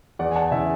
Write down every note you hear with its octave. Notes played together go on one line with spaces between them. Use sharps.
E2 D5 F#5
G#5
F#5 A5
C#3 E3 E5 G#5